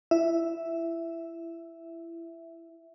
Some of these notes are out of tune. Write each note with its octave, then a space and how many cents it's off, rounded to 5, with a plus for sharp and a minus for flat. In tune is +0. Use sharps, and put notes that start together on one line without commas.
E4 +25 E5 +0